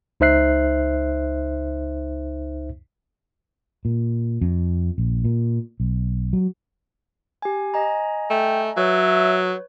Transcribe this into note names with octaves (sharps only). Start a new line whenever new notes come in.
C#2 D#4 C5 E5 F#6 C7
A#2
F2
A#1
A#2
B1
F#3
G4 G#5
D#5 G#5 A#5
A3 G5
F#3 B4 C#5 E5 G6